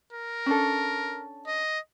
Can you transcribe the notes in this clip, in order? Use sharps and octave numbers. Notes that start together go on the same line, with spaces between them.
A#4
C#4 D4 A4
D#5